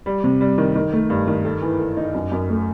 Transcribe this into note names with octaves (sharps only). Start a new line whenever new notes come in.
G3
C3
G3
D#3
D#3
A3
G2
D#3
A4
E3
A4
D#4
F#2
F#2
A3